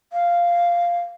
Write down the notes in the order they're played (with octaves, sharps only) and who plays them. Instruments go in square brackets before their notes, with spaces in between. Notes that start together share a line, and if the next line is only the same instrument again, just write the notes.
[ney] F5